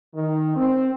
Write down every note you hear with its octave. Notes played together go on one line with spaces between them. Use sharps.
D#3
C4